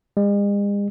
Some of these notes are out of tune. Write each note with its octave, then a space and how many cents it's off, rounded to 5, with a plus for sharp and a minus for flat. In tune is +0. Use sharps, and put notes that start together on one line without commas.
G#3 -45